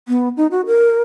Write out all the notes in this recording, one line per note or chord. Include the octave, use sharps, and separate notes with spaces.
B3
D#4
F#4
A#4